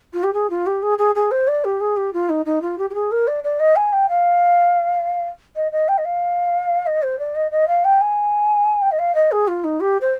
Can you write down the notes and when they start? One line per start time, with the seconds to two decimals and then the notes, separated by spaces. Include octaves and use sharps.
0.13 F4
0.23 G4
0.33 G#4
0.50 F4
0.67 G4
0.82 G#4
0.98 G#4
1.15 G#4
1.31 C5
1.48 D5
1.64 G4
1.81 G#4
1.97 G4
2.13 F4
2.29 D#4
2.46 D#4
2.62 F4
2.78 G4
2.90 G4
2.94 G#4
3.12 A#4
3.27 D5
3.44 D5
3.60 D#5
3.76 G#5
3.93 G5
4.09 F5
5.56 D#5
5.72 D#5
5.88 G5
5.98 D#5
6.05 F5
6.86 D#5
7.03 C5
7.19 D5
7.35 D#5
7.51 D#5
7.68 F5
7.84 G5
8.01 G#5
8.82 G5
8.91 D#5
8.99 F5
9.15 D#5
9.32 G#4
9.48 F4
9.64 D#4
9.80 G4
10.01 C5